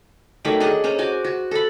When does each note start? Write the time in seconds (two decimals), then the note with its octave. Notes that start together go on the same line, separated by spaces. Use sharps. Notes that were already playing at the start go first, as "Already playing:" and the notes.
0.45 D#3 F#3 A3 B5
0.60 D4 G#4 D#5 F#5
0.84 C#4 C5 A#5
0.98 F#4 G#5 D6
1.24 F#4
1.51 A4 B5